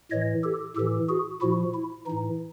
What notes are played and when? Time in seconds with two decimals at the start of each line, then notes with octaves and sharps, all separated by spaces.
0.11 A2 E3 C#5 D#5
0.44 G4 A4
0.76 A2 E3 G4 A4
1.09 F#4 G#4
1.42 A#2 F3 E4 F#4
1.74 E4
2.06 A2 E3 D#4